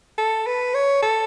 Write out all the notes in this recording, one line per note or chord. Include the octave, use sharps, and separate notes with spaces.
A4
B4
C#5
A4